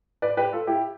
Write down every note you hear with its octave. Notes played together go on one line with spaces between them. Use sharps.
B4 D5
G4 B4
F4 A4
E4 G4